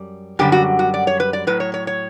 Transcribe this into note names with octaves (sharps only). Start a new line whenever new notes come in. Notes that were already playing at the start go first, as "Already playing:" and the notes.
Already playing: F#2 G3
F#2 D3 G3 G4
F#4
F#4
D5
C#5
B4
D5
A2 F#3 B4
C#5
C#5
C#5